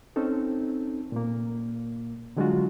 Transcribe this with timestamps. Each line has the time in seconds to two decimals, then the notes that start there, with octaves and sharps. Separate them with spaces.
0.16 C4 C#4 D#4 A4
1.12 A#2 A#3
2.37 D3 F#3 G#3 D4 F4 F#4